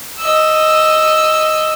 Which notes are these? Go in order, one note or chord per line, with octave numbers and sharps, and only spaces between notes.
D#5 E6